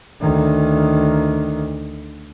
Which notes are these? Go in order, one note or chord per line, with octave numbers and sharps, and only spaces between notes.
D2 D#3